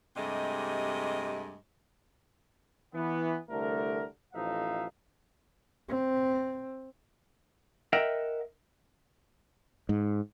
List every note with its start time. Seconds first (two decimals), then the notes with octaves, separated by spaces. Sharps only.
0.16 G2 C3 G#3 A3 G4 D#5
2.94 E3 B3
3.50 C2 D3 A3 A#4
4.34 A1 F2 F3 D#4 E5 F5
5.88 C4
7.93 A#4 D#5 E5 F#5 G5 A#5
9.89 G#2